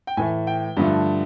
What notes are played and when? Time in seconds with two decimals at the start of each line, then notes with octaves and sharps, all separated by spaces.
0.07 G5
0.17 A2 E3 A3 G#5
0.47 G5
0.77 G2 D3 F3 A3